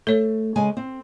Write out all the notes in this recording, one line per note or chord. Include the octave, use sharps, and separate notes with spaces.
A3 A4 C#5
C#3 G#3 G#5
C4